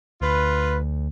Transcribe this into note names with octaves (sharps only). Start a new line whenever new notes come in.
D2 F4 B4